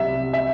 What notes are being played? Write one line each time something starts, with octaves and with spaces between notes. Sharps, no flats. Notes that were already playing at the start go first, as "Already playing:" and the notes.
Already playing: C2 C3 F#3 E5
E5